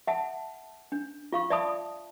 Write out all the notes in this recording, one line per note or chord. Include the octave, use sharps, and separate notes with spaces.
E5 F#5 A5
D4
F4 F5 C#6
D5 E5 A5 B5 D#6